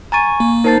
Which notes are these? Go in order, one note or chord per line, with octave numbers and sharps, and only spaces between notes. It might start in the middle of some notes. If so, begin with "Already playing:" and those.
G#5 A#5 C#6 A6 D#7
A#3
D#4 A#4 C5 A5 A6 C7